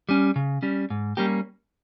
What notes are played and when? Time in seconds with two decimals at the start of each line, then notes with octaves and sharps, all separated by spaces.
0.09 G3 C#4
0.36 C#3
0.63 G3 C#4
0.90 G#2
1.17 G3 A#3 C#4 G4